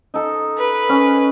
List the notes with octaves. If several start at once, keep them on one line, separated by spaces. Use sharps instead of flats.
D#4 A4
B4
C#4